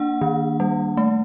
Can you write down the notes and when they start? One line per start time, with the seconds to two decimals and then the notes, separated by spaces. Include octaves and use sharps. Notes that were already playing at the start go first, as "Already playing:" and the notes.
Already playing: A#3 D4 F#5
0.21 D#3
0.60 G3
0.97 A3